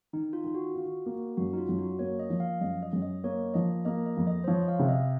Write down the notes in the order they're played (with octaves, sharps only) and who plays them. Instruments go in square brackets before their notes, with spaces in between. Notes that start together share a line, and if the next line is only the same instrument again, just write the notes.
[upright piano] D#3 [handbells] D#4
[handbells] F4
[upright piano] D#3
[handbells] F#4
[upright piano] F4
A#3
[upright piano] F#2 [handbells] F#4
[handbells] D#4
F4
[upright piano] F#2
[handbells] F#4
[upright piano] A#3 [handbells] C#5
[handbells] D#5
[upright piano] F3
[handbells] F5
[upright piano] F#2 [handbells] D#5
[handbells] D#5
[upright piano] F#2
[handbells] D#5
[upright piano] A#3 [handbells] C#5
[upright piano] F3 [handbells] D#5
[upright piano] A#3 [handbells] D#5
[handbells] D#5
[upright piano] F2
[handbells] D#5
C5
[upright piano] F3 [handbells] C#5
[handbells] F5
[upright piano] C3
[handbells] D#5